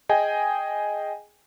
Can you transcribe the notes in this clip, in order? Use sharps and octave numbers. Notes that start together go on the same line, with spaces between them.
G#4 D#5 G5 G#5